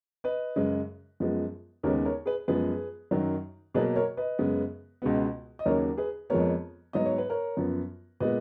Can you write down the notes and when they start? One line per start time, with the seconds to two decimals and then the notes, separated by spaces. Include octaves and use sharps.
0.24 B4 D#5
0.56 F#2 C#3 G#3
1.20 F#2 F3 G#3 B3
1.83 D#2 C#3 G#3 B3 A#4 C#5
2.05 A#4 C#5
2.26 G#4 B4
2.48 F#2 F3 G#3 B3 G#4 B4
3.11 F#2 D#3 F#3
3.74 B2 F#3 A#3 G#4 B4
3.96 A#4 C#5
4.17 B4 D#5
4.39 F#2 C#3 G#3 B3
5.02 C#2 B2 G#3 B3
5.59 D#5
5.66 D#2 C#3 F#3 A#3 A#4 C#5
5.97 G#4 B4
6.30 F2 F3 G#3 B3 A#4 C#5
6.93 G#2 F#3 B3 D#5
7.06 C#5
7.18 B4
7.30 A#4 C#5
7.57 F#2 F3 B3
8.20 A#2 G#3 B3 B4 D#5